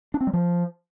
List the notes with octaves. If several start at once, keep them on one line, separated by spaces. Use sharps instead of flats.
D4
C4
G3
F3